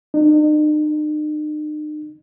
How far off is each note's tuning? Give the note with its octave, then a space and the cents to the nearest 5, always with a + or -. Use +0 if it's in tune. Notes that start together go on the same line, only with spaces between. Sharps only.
D#4 -45